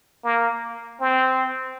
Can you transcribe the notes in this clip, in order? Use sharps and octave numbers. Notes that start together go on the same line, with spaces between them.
A#3
C4